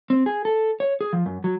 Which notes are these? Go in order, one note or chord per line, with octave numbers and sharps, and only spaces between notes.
C4
G#4
A4
C#5
G#4
F3
F#2
F#3